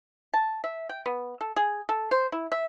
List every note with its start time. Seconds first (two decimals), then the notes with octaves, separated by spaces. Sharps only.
0.34 A5
0.64 E5
0.89 G5
1.06 B3
1.41 A4
1.56 G#4
1.89 A4
2.11 C5
2.32 E4
2.52 E5